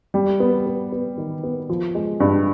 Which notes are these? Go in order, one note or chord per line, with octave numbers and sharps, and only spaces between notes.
G3
B3
B3
B3
D#3
B3
F3
G#3
G2